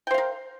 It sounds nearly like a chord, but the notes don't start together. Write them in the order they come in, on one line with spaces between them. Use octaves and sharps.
G5 C5 F5 A#4